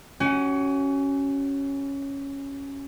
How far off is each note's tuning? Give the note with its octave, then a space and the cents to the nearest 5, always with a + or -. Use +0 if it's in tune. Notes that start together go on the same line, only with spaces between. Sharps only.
C#4 +0 F#4 +35